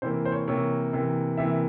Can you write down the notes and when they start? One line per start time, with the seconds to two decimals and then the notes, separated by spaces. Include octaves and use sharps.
0.02 C3 E3 A#3 C5
0.25 C5
0.32 C#5
0.48 C3 E3 A#3 C#5
0.93 C3 E3 A#3
1.37 C3 E3 A#3 E5